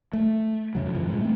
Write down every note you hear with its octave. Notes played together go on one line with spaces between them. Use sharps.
A3
F2 C#3 F#3
G2 E3 F3
A#2 G#3
A3 C4